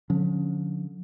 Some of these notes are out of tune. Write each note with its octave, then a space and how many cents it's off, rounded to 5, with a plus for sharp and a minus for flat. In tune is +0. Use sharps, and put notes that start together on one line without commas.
D3 +0 F3 +45 C#4 +5